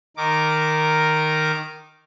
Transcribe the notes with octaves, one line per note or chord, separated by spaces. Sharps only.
D#3 A#4 D6